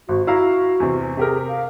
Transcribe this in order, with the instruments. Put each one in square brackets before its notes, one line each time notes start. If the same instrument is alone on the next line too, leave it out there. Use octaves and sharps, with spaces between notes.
[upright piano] G#1 [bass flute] F#4
[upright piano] E4 F5 A#5 [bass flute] F#4
[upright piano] E2 C3
[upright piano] C3 G4 A#4 [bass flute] G#4
[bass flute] F5